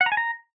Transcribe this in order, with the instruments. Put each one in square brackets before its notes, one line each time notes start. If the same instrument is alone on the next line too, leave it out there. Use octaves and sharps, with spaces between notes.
[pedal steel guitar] F#5
A#5
G#5
A#5